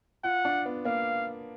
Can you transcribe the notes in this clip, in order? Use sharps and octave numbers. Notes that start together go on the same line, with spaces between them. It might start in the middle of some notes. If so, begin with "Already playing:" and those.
F4 F#5
D4
B3
A#3 F5